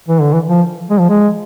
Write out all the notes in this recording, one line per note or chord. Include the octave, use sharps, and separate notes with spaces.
E3
D3
E3
F3
G#3
F3
G#3